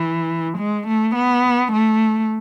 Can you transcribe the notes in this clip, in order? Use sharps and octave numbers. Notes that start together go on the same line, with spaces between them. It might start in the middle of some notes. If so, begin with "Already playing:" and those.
Already playing: E3
G#3
A3
B3
A3